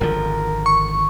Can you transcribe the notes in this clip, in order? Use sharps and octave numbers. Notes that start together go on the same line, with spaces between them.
G#1 D3 F3 A#4
C#6